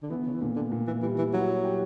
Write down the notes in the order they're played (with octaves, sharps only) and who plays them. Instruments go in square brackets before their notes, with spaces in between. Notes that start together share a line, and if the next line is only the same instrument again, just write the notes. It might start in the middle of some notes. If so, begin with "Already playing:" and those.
[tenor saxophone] D3
[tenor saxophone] E3 [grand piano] B3
[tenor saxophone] C#3
E3
[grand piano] A#2 [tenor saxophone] D3
[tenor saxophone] D3
[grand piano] A#2
[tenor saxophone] E3
[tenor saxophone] E3 [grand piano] G3
[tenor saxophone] E3
[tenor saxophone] F#3 [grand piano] E4
[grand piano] G4